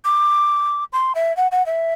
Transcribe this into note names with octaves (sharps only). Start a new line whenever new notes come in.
D6
C6
E5
F#5
F#5
E5